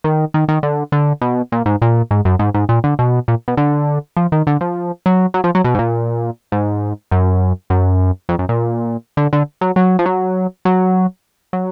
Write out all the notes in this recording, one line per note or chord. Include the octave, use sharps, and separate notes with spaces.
D#3
D#3
D#3
D3
D3
B2
A#2
G#2
A#2
G#2
F#2
G#2
G#2
A#2
D3
B2
A#2
B2
D3
F3
D#3
D3
F3
F#3
F#3
F3
F#3
B2
G#2
A#2
G#2
F#2
F#2
F2
F#2
A#2
D3
D3
F#3
F#3
F3
F#3
F#3
F#3